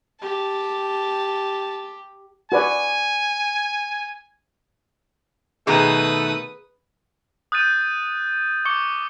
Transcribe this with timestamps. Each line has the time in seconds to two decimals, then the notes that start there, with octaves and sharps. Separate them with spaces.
0.22 G4 A5
2.52 F#4 B4 D5 G#5
5.67 B2 D#3 A3 G#4 B4 A#5 D#6
7.52 D#6 F#6 G6 A6 D#7
8.65 C#6 D6 C#7 G7